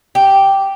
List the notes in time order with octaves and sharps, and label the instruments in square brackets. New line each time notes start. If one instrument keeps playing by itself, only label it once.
[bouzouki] G4